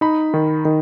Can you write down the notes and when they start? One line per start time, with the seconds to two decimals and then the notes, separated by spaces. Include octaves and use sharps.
0.01 D#4 B5
0.34 D#3
0.65 D#3